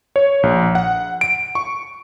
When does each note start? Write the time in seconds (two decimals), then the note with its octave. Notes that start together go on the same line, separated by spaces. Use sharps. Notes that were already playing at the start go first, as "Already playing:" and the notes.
0.16 C#5
0.43 A#1
0.75 F#5
1.21 D7
1.55 C#6